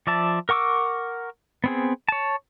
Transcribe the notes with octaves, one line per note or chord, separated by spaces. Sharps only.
F3 D5 E5 A5
A#4 F#5 C#6 D6 E6
B3 C4 G#4
C#5 A5